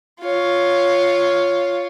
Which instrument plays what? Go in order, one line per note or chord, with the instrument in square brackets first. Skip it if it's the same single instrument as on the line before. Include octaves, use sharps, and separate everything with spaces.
[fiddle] F4 C#5